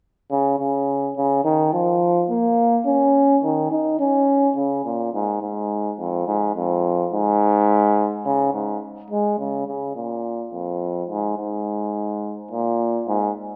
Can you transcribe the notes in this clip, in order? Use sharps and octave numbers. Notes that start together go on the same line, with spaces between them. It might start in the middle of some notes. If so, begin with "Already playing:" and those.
C#3
C#3
C#3
D#3
F3
A#3
C#4
D#3
D#4
C#4
C#3
A#2
G#2
G#2
F2
G#2
F2
G#2
C#3
G#2
G#3
C#3
C#3
A#2
F2
G#2
G#2
A#2
G#2